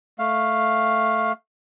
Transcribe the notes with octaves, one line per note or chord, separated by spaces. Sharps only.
A3 F5